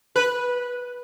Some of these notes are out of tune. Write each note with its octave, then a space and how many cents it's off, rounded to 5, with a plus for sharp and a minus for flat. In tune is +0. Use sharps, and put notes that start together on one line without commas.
B4 -10